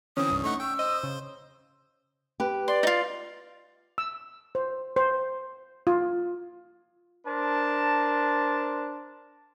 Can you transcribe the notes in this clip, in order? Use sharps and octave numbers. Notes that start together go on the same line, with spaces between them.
D3 E3 C4 C#4 D#6
C2 G2
A3 D#4 F#5 C#6
G5 E6
C5 D#5
C#3
G4 B4
D5 C6
D#4 F4
E6
C5
C5
F4
D4 A#4 C5 A5